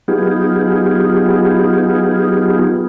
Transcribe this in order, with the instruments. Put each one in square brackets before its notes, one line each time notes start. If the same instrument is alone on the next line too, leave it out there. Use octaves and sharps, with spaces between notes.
[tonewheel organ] F#3 B3 D#4 F4 G4 G#4